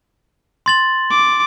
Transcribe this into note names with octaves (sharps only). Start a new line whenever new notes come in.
C6 A6 F#7
D6